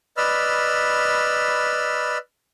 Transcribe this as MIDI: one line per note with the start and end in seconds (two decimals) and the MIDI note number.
0.17 2.18 71
0.17 2.18 74
0.17 2.18 75
0.17 2.18 83
0.17 2.18 88
0.17 2.18 89